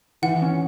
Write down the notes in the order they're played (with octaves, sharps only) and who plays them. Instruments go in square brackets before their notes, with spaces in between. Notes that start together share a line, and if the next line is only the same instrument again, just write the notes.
[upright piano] E3 [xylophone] F#5
[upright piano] C#4